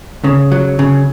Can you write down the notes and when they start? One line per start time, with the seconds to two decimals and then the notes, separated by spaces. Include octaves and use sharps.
0.24 C#3
0.52 F#3
0.79 C#3